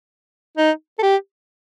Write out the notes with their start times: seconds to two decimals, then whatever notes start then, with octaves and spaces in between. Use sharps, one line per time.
0.58 D#4
0.99 A4
1.03 G4